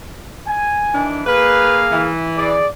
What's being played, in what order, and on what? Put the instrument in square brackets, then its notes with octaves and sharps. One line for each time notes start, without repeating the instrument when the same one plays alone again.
[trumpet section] G#5
[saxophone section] D#3 E3 D4
[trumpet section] A#3 G#4 F5 [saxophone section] B4
[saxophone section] E3
[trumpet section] G#4 D5